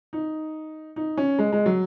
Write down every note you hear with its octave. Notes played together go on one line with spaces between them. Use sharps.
D#4
D#4
C#4
G#3
G#3
F#3